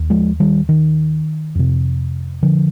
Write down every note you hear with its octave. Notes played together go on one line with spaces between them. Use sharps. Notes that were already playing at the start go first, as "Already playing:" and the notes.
Already playing: D#2
F3 G#3
D#3 G3
D#3
F2 C3
D3 F3